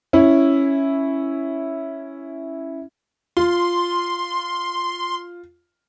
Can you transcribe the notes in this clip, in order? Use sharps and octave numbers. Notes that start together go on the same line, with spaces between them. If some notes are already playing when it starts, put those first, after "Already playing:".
C#4 E4
F4 C6